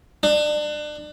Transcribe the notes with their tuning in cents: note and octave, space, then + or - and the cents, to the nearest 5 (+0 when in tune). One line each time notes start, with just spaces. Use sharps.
D4 +30